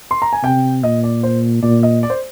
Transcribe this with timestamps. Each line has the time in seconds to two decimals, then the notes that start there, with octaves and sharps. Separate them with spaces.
0.11 C6
0.22 A#5
0.33 G#5
0.43 C3 G5
0.83 A#2 D#5
1.03 D5
1.23 C5
1.63 A#2 D5
1.83 D#5
2.03 D5
2.10 C5